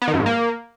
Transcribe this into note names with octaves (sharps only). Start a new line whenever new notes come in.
B3
D#3
F#2
G#2
A#3